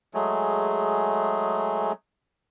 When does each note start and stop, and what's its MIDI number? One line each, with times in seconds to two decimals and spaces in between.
0.14 1.92 54
0.14 1.92 56
0.14 1.92 57
0.14 1.92 68